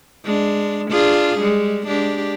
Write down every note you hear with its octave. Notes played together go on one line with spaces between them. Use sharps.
G#3 D4
D4 F4 G#4
G3 G#3
G#3 D4 G4